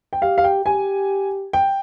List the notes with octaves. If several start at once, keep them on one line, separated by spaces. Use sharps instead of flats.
G5
G4 F5
F5
G5
G4 G#5
G5